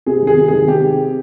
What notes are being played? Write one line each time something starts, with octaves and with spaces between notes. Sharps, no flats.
C3 G#4
D#3 G#4
C3
D#3 G#4
C3 G4